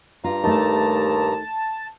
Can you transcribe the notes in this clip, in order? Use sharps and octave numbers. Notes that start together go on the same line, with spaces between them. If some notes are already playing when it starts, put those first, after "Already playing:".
G2 F4 A#5
D#2 A3 D#4 A5